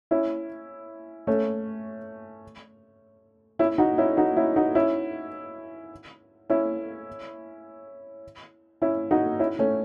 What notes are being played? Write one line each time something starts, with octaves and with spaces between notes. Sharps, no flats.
C#4 E4
A3 C#4
C#4 E4
D#4 F#4
C#4 E4
D#4 F#4
C#4 E4
D#4 F#4
C#4 E4
C#4 E4
C#4 E4
D#4 F#4
C#4 E4
A3 C#4